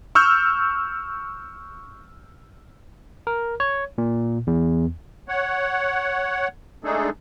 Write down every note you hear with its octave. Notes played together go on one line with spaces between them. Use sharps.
C#6 E6 F6 G6
A#4
C#5
A#2
E2
C#5 F#5
G#3 A3 D4 D#4 G#4 A4